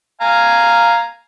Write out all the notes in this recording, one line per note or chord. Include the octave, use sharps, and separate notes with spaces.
F5 G#5 A#5